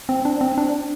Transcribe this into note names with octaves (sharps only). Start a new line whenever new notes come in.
C4
D4
C4
D4